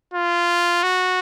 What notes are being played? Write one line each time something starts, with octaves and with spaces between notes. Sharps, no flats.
F4
F#4